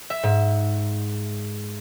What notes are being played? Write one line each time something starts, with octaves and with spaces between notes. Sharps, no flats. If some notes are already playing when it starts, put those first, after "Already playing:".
E5
G#2